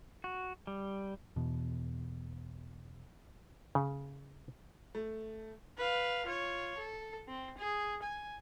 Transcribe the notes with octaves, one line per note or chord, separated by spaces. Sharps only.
F#4
G3
E2 B2
C#3
A3
B4 F5
F4 C#5
A4
C4
G#4
G#5